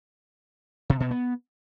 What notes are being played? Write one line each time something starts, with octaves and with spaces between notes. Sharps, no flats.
C3
B2
B3